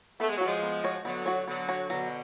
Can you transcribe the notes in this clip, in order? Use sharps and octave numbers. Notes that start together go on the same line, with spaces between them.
A3 B3
G#3
F#3
F3 G#3 F#4 C#5
B3
F#4 C#5
D3 F#3 B3
F#4 C#5
D3 F#3 B3
F#4 C#5
B2 D3 F#3